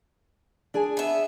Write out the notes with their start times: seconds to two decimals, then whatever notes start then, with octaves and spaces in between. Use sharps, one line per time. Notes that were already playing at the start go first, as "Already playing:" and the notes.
0.74 D4 G#4 G#5
0.97 B3 E5